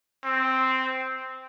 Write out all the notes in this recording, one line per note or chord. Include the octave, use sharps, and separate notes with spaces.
C4